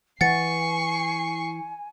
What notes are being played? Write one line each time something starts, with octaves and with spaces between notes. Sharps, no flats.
E3 F#5 G#5 C#6 A6 C7 C#7